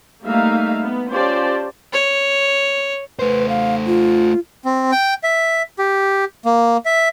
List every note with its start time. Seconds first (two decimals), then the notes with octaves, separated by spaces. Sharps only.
0.25 G3 A3 A#3 D#4 E5 F5
0.83 B3
1.13 C#4 F4 G4 C5 D5 A5
1.93 C#5
3.19 A3 B4 C5
3.49 F5
3.87 F4
4.65 C4
4.92 G5
5.24 E5
5.79 G4
6.45 A#3
6.85 E5